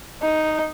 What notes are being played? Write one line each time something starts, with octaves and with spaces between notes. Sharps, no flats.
D#4